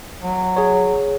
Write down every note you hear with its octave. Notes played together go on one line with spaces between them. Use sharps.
F#3
G#4 C#5